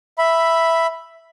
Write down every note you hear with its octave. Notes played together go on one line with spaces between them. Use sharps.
E5 B5